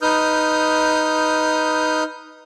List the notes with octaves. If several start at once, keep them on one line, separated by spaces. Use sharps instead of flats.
D#4 B4 D#6 F6 G6